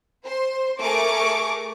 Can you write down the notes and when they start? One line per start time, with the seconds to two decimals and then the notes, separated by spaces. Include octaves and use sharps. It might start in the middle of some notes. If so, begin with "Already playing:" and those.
0.25 C5 C6
0.80 A3 G#4 A#4 C#6 D6 D7